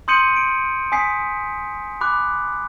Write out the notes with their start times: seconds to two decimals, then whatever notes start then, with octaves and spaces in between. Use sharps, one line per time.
0.08 C6 D#6 G6 C#7 D#7 F#7
0.36 D7
0.92 G#5 D#6 B6 C7
2.01 B5 D6 F#6